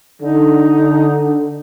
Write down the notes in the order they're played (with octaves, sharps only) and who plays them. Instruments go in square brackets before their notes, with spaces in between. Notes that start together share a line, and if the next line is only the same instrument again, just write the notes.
[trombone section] D3 [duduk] D#4